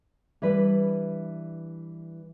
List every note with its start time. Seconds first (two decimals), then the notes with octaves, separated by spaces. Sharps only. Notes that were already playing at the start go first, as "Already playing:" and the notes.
0.42 E3 G3 D4 B4